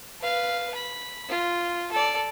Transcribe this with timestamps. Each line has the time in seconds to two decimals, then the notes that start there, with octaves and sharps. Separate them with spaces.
0.21 B4 F5
0.75 B5
1.29 F4
1.92 A4 D5